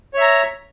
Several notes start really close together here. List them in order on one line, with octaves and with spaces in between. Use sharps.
C#5 E5 A#5